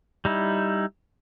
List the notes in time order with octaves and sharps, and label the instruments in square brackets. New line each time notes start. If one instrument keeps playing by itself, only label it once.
[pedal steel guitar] G3 D#4 E4